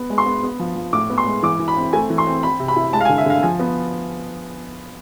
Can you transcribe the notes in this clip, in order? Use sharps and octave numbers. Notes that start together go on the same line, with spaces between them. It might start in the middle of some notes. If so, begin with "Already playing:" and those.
Already playing: B3
G#3
C6
B3
B3
F3
F3
A2 D6
B3
C6
G#3
E3 D6
E3
B5
C4
A3 G#5
E3
C6
C4
C4 B5
C3
B5
E4
G#3 A5
F5
G#5
D3
E5
D3 F5
F3 G#5
B3